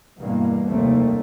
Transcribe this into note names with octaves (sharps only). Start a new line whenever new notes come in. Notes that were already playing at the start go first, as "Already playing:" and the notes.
E2 G2 B2 A#3
F1 D#2 A3 A#3 C4